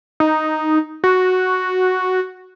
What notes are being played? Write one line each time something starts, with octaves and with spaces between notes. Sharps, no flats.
D#4
F#4